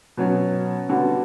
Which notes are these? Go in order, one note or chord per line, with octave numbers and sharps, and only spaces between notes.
B2 F#3 C#4
D3 G3 B3 F#4